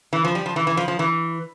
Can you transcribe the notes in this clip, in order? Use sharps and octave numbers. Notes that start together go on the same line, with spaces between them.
E3
F3
G3
F3
E3
E3
F3
F3
E3